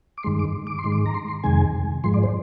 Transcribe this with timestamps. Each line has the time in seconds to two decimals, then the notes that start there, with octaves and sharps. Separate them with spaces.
0.18 D6
0.23 G2 D#3 G#3 C6
0.39 D6
0.67 D6
0.79 C6
0.84 G#2 D#3 G#3
0.92 D6
1.06 A#5
1.14 C6
1.28 C6
1.43 F2 C3 D#3 G#3 G#5
2.04 G#2 F3 G#3 C6
2.14 D5
2.23 C5